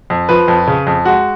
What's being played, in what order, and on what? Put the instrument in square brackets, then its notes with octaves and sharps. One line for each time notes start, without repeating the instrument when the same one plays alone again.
[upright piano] F2
F3 B4
F2
C#3
F2
G#3 F#4